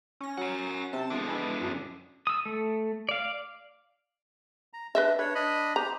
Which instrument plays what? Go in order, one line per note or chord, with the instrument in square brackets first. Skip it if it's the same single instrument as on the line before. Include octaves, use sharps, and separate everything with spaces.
[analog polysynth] C#4 A#6
[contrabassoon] F#3 [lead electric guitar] A#4 F#5
[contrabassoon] C3 [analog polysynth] A5
[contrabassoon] E1 [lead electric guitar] D3 F3
[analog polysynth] G#3 B3 E4
F#2
[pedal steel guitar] D#6 E6
A3
D5 F5
[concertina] A#5
[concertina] D4 [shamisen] B4 D#5 E5
[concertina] D4 C#5 [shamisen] B4
[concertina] D4 D#5 B5
[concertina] G4 C5 [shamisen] A#5